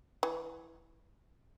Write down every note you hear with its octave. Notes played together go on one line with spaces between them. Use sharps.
E3